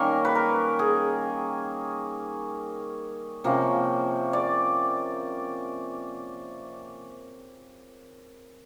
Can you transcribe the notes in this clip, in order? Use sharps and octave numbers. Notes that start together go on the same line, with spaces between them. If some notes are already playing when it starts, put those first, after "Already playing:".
Already playing: D#3 G3 A#3 C#4 A#4
B4
A#4
G#4
C3 F3 A#3 C#4
D5